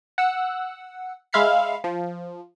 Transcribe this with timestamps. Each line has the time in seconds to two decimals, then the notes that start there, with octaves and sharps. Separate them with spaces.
0.18 F#5 E6 C#7
1.33 G#3 E5 F5 B5 C7 C#7
1.84 F3